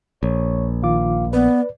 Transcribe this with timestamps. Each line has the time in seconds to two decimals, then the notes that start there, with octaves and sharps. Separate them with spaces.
0.23 A#1 C#5
0.83 D#3 F4 F5 D6
1.33 B3 B4 D5